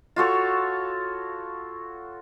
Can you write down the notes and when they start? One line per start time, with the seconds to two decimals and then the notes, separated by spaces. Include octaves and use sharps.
0.16 F4 F#4 A4 C#5